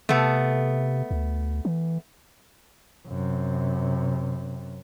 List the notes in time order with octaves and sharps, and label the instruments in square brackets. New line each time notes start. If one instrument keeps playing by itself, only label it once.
[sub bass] C3 [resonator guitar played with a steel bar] A3 B3
[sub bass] D2
E3
[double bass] F#2 C3